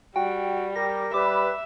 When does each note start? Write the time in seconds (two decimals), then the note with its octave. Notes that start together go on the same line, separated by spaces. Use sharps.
0.16 G3 F#4 G5
0.76 G4 A#4 A#6
1.14 G3 B4 E5 D6